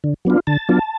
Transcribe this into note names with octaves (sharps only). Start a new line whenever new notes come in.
D3
F#3 B3 D4 F4
D3 A5
F#3 B3 D4 F4